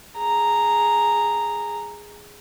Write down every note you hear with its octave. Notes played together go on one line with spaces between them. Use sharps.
G#4 A#5